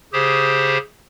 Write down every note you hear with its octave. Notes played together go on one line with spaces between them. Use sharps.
C#3 G4 G#4 C5